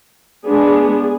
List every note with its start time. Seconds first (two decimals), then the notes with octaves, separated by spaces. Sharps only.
0.46 G#3 B3 D4 G#4